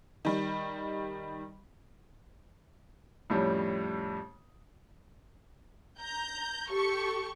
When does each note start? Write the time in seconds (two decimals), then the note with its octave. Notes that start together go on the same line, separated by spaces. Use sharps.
0.25 D#3 G3
3.30 F2 A2 G3 C#4
6.00 A#5 G6
6.71 G4 A4 C#6